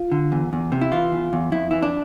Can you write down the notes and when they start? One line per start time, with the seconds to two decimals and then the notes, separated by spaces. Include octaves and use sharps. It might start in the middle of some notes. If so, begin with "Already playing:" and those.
Already playing: F4
0.12 D3
0.32 E2
0.53 E2
0.72 C3
0.81 E4
0.92 E3 F4
1.12 E2
1.33 E2
1.52 F2 E4
1.71 E3 E4
1.83 D4